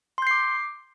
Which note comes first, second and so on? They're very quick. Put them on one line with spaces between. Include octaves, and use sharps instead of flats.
C6 G6 C7 D6